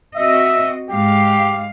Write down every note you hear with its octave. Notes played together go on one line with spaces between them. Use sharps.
C4 F#4 D#5 E5
G#2 G#3 G4 F5